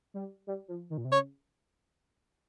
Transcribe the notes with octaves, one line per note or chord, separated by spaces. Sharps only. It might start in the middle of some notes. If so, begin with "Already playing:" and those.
G3
G3
F3
D#3
A#2
C3
C#3 C#5